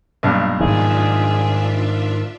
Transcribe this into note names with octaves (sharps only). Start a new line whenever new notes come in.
B1 G2 A#2
G#2 D#3 D4 F4 G#4 E5